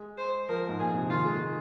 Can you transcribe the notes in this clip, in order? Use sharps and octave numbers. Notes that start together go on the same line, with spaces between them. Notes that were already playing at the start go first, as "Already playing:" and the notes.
Already playing: G#3
C5
F3 A#4
G#2
A#2 G#4
A#2
C3
D#3 F4
G#3